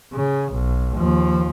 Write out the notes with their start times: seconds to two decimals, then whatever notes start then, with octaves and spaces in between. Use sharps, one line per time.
0.13 C#3
0.52 B1
0.96 D#2 F3